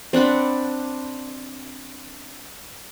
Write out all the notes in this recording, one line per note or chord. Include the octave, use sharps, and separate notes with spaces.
C4 D4 F#5 B5